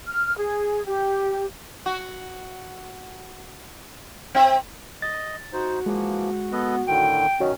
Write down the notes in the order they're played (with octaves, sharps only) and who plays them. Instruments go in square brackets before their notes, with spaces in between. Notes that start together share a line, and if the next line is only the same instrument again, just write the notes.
[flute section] F6
G#4
G4
[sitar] F#4
C4 E5
[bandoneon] D#5 [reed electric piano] A6
[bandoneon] D#4 C5 [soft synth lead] F#4
[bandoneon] E3 F3 A#3 [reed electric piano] G#3
[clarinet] B3 [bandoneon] A4 B4 D#5
[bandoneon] A2 D3 D#3 [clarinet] G5
[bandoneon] D#3 C#4 [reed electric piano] F#4 C#5 D#5